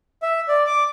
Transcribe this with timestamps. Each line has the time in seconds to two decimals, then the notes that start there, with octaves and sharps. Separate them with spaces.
0.23 E5
0.48 D5
0.66 D6